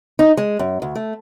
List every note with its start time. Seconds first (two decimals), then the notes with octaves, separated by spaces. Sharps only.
0.19 D#4
0.37 G#3
0.59 F#2
0.82 D2
0.95 A3